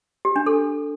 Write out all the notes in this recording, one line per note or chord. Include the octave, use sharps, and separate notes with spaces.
G4
D4
A4